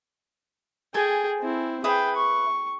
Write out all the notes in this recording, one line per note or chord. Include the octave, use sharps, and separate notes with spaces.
G#4 A4 G5 G#5
C4 E4
G#4 B4 E5 G5 D#6
C#6